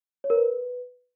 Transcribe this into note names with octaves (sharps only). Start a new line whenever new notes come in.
C#5
A#4
B4